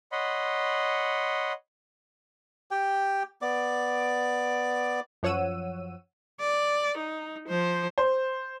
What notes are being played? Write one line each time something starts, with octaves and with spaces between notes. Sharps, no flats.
C#5 D#5 F#5 B5 C6
G4 G5
B3 D5 D6
F#2 F3 C#5 F#5 E6 D#7
D5
D#4
F3 C5
C5